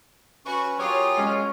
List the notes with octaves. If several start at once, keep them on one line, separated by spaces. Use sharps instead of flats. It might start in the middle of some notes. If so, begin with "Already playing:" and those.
C#4 F#4 B4 C#6
F#3 F4 G4 G#4 A#4 C#5
G#3 C#4